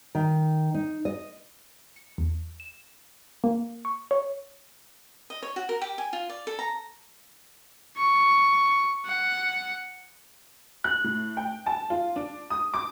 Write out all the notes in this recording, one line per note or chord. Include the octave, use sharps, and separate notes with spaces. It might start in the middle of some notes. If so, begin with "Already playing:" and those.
D#3
D#4
D#5
C#7
E2
E7
A#3
C#6
C#5
D#5
C#5
F#4
A#4
G4
G#5
F4
D5
A4
A#5
C#6
F#5
F#6
A2
G5
A5
F4
D4
D#6
D6